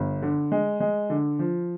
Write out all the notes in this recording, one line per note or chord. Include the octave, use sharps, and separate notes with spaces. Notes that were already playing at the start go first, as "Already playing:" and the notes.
Already playing: G1
D3
G#3
G#3
D3
F3